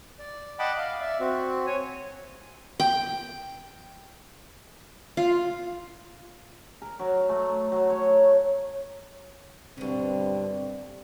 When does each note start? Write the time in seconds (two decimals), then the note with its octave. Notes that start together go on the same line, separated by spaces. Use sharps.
0.19 D5
0.59 D#5 F#5 G5 A5 B5 D6
0.78 F5
1.01 D5 E5
1.20 C4 F#4
1.67 C#5 G#5
2.80 G5
5.17 F4
6.82 A#4
7.00 F#3
7.29 A3
7.72 F#3
7.90 C#5
9.78 G2 B2 D3 C4